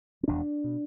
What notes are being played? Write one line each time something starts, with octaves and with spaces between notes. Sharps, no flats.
C4
E1 E2 B2 D4
B2